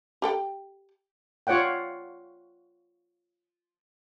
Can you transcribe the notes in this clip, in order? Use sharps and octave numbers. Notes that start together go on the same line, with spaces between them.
G4 A4 G5
F4 C#5 D5 F#5 G5